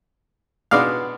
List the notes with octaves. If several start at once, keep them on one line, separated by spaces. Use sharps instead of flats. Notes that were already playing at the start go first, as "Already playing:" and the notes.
B2 G#3 B3 D4 D5 F5